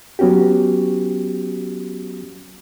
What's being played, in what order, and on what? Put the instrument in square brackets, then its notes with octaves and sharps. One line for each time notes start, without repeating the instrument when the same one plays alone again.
[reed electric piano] F#3 B3 C#4 F#4 G4